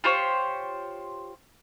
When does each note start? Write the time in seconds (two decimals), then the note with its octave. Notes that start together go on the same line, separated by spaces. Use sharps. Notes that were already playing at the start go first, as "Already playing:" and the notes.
0.04 F4 G4 C5 C#5